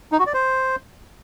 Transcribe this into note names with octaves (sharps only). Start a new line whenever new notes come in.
D#4
F#4
D5
C5